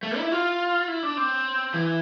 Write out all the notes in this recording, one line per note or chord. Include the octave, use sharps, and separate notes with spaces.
A3
E4
F4
E4
D4
C4
E3